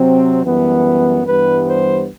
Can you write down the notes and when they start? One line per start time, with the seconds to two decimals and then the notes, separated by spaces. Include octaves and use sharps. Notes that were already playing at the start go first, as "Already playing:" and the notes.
Already playing: C3 F#3 C4
0.45 F#2 E3 G3 B3
1.27 G2 E3 G3 B3 B4
1.68 C5